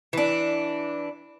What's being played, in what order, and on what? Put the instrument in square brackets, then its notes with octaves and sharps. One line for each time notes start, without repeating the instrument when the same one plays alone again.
[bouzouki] E3 D4